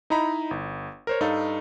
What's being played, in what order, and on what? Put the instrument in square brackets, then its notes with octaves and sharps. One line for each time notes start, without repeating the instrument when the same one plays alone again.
[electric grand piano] D#4 E4 D#5 A#5 B5
G1
A#4 C5 C#5
G2 D#4 A4 F5